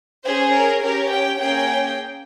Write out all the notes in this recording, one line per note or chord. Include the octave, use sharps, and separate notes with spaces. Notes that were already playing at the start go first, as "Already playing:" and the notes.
C#4 G#4 C5
A#4
C#4 G4 A#4
G5
A#3 C#4 G#4 G5